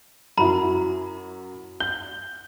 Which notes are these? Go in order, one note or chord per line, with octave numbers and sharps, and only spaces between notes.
F#2 F#3 E4 A#5 B5
G6 G7